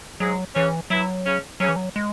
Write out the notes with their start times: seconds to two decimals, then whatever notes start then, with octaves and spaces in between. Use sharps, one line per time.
0.20 G#2 F#3 G#3
0.55 C#3 E3 C#4
0.90 E3 F#3 E4
1.25 C#3 C#4
1.60 C#3 F#3 C#4
1.69 E3
1.76 F#3
1.96 G#3